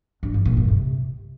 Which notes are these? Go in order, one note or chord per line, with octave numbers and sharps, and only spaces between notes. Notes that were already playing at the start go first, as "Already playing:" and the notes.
G2
F3
A#2
G2
C3